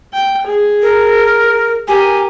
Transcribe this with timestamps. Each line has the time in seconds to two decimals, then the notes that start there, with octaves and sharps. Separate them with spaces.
0.13 G5
0.47 G#4
0.82 A#4
1.88 G4 A#4 G#5